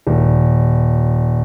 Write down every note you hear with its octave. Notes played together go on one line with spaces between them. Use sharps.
D#1